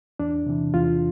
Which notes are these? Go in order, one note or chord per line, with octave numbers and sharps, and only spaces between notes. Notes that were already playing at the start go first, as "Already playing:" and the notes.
E2 D4
C3 E3
E2 F4